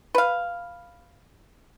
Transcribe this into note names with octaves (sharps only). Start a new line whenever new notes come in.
B4 F5